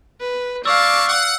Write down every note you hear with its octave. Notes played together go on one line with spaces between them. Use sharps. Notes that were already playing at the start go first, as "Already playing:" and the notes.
B4
G3 C#4 D5 F5 A5 C#6 D6 E6
F#5